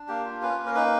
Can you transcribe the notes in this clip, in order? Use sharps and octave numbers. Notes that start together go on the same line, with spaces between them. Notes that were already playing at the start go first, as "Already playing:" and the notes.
Already playing: D4
A#3 G4
F4
C#4 B4
A#3
A#4
D#4 B4